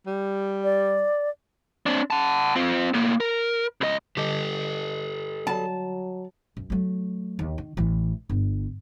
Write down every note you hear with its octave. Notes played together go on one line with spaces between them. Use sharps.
G3
D5
C4 D4
F#5 A5
C4 F4
A2 A#3
A#4
C#2 D#5
D3 G3 G4 A4 D#5
F#3 A5
F#2
F#3 A3
D#2
D#3
A1 E3
G1